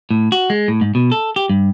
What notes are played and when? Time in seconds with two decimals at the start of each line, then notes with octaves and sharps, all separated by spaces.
0.11 A2
0.32 F#4
0.50 G#3
0.68 A2
0.81 G#2
0.95 B2
1.12 A4
1.36 G4
1.50 G2